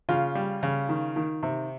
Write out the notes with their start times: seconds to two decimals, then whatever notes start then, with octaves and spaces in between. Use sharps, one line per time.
0.09 C#3 F4
0.35 G3
0.63 C#3
0.89 D#3
1.16 D#3
1.43 C3